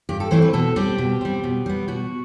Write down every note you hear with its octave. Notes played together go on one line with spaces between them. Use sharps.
G2 G4
A4
E3 A3 C4 C5
B4
B2 A4
G3 C4 G4
B2
G3 C4
B2
G3 B3
B2 F#4